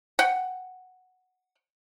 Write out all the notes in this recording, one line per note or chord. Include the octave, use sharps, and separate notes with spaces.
F#5 G5